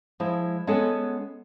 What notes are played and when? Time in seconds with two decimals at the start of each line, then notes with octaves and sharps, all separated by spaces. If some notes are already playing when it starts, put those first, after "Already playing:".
0.20 F3 G#3 E4
0.67 G#3 B3 C#4 A4 F#5 G#5